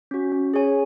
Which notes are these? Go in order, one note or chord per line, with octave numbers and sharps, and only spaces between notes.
C#4 F#4
C#4
G#4 C#5 G#5